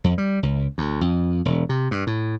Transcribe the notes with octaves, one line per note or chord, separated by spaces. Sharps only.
F2
G3
C#2
D2
F2
E1
C3
G2
A2